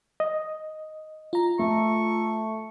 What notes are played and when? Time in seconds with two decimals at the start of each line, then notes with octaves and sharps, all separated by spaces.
0.20 D#5
1.33 F4 A#5
1.59 A3 A4 C#6